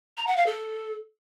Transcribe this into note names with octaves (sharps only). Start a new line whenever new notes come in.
A#5
F#5
F5
A4